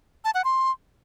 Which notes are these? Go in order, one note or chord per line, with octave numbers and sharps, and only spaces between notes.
A5
F#5
C6